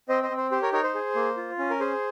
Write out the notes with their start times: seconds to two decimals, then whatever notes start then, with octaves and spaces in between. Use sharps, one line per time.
0.09 C4 C5 D#5
0.23 C5 D#5
0.30 C4
0.37 C5
0.52 G4 C5
0.62 A#4 C#5
0.73 D#4 A#4 C#5
0.84 C5
0.95 G#4
1.16 A#3
1.37 F4
1.58 C#4
1.70 A#4
1.80 G#4 C5